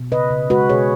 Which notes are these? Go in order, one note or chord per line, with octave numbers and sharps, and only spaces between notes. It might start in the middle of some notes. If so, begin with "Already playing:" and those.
Already playing: B2
C#3 B4 D#5
C#3
G#3 F#4 B4
B2 G#4 C#5